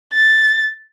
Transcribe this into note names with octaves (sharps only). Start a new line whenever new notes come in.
A6